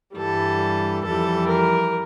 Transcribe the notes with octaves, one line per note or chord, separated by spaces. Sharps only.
G2 E3 G3 A4
F2 E3 G3 A4
A#4